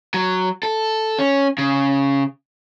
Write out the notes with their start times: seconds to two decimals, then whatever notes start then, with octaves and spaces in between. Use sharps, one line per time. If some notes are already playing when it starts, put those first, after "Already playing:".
0.14 F#3
0.63 A4
1.19 C#4
1.58 C#3